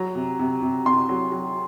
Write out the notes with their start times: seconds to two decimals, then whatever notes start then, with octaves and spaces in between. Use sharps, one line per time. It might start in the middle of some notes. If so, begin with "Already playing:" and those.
Already playing: F#3 A#5
0.15 C3
0.39 C3
0.62 C3
0.85 C3 C6
1.09 F#3
1.32 F#3